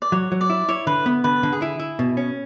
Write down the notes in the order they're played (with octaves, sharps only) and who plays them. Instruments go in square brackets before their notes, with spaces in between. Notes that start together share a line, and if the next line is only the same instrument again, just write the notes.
[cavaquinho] D5
[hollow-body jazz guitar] F#3 [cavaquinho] C#5
[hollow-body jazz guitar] F#3
[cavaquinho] D5
[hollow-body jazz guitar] E4
[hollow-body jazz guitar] E4 [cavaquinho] C#5
[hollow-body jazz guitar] D3 [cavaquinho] B4
[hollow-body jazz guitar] B3
[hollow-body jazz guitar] D3 [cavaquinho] B4
[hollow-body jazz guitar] D3
[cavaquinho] G#4
[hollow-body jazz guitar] E4
E4
B2
C#4